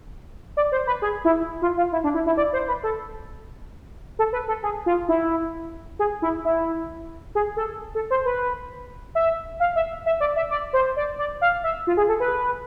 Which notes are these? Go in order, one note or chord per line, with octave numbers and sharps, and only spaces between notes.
D5
C5
B4
G#4
E4
F4
F4
E4
D4
E4
E4
D5
C5
B4
A4
A4
B4
A4
G#4
F4
E4
G#4
E4
E4
G#4
A4
A4
C5
B4
E5
F5
E5
E5
D5
E5
D5
C5
D5
D5
F5
E5
F4
G#4
A4
B4